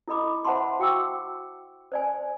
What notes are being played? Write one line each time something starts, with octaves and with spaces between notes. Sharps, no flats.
E4 A4 D#5 B5 D6
C5 E5 F#5 A5 B5 C6
F#4 F5 G5 C#6 D6 E6
C5 D5 G#5